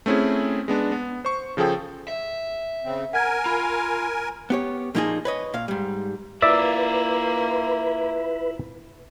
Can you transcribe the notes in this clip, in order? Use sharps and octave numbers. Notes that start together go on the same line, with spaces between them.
A3 C4 C#4 E4 G#4
G#3 B3 D4
B3
C5 C#6
C#3 F3 G#4 A4 G5
E5
C#3 C4
A#4 F#5 G#5 G#6
F4 B5
B3 G4 C#5
A#2 F3 A#3 D#4 F4 G#4
B4 C#5 D#5
A#2 F5
G#2 G3
A#3 E4 F4 B4 D5 E5